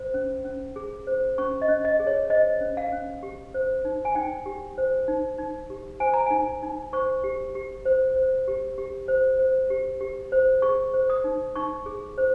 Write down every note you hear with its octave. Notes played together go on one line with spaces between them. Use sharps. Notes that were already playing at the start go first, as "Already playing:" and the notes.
Already playing: C5
C#4
C#4
G#4
C5
C#4 C#6
D#5
C#4
D#5
G#4
C#5
C5 D#5
C#4
F5
C#4
G4
C5
D#4
G#5
D#4 G5
G4
C5
D#4
D#4
G4
C5 G#5
A#5
D#4 G#5
D#4
C5 C#6
G4
G4
C5
C5
G4
G4
C5
C5
G4
G4
C5
G#4 C#6
C5
D#6
D#4
D#4 C#6
G#4
C5